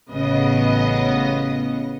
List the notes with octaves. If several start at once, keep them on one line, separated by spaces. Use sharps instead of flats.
A1 C#3 B3 D#5